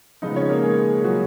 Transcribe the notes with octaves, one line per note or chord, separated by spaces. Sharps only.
C#3 F3 G#3 B3 D#4 D#5
C#4 C#5
A#3 A#4
G#3 G#4
F#3 F#4